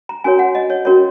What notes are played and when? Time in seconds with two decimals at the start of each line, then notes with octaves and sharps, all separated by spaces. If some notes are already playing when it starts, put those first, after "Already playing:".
0.09 A#5
0.24 C#4 F#4 A#4 C#5 G#5
0.39 F#5
0.55 D#5
0.70 C#5
0.85 C#4 F#4 A#4 C#5